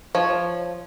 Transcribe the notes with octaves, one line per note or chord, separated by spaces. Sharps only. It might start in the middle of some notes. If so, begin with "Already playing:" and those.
F3 C#5